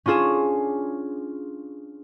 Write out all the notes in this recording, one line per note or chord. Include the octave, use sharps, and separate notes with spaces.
C#4 D4 F4 G#4 E7